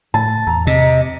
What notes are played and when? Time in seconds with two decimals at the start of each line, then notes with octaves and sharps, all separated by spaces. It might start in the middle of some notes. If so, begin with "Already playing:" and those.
0.14 A2 A5
0.47 E2 A#5
0.67 C3 D#5